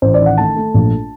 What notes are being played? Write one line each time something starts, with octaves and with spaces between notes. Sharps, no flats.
A1 C5
D5
D#3
F#5
A3 A5
A3
A#1